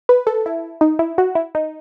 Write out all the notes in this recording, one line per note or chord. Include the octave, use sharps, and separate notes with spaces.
B4
A4
E4
D#4
E4
F#4
E4
D#4